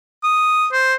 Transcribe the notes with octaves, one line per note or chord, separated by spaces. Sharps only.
D#6
C5